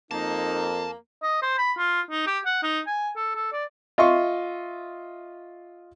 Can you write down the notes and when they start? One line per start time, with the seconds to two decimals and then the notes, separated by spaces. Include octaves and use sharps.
0.11 F2 A#3 D#4 A5
1.23 D#5
1.42 C5
1.58 B5
1.78 F4
2.11 D#4
2.27 G4
2.46 F#5
2.63 D#4
2.87 G#5
3.16 A4
3.35 A4
3.53 D5
3.98 F4 D#5 E5 C6 C#6